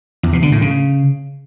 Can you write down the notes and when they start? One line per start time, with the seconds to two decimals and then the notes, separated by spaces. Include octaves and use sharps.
0.23 E2
0.33 B2
0.42 D3
0.52 A2
0.61 C#3